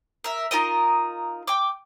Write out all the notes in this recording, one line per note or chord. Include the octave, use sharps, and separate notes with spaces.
A#4 E5
D#4 F4 A#4 D#5
G5 D6